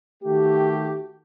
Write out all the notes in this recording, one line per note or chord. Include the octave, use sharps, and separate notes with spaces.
D#3 A3 F#4 G4